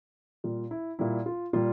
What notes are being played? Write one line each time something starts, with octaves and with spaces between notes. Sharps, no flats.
A#2 G3 F4
E4
A#2 G3 E4
F4
A#2 G3 F4